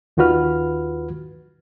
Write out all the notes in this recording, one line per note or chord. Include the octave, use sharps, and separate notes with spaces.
D#2 D#3 F4 F#4 B4 F6